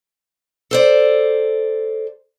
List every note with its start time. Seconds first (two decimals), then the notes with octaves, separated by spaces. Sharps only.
0.71 A4 C5 D5